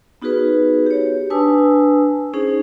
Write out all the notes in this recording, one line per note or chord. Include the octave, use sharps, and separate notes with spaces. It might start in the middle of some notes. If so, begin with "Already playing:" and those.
B3 D#4 F#4 G#4 B4
G4 C#5
D4 B4 G#5 A5 D#6 E6
C#4 D#4 G#4 C5